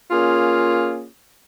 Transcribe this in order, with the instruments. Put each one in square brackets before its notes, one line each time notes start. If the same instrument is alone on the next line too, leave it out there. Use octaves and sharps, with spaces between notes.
[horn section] A#3 C#4 F4 G#4